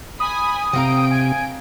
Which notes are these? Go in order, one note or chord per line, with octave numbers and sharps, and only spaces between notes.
G#5 B5 D#6
C3 C4 F5 G5 A#5 D7
G#5